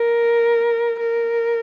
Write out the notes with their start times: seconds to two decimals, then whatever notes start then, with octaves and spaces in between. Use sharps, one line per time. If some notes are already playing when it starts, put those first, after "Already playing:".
Already playing: A#4
0.99 A#4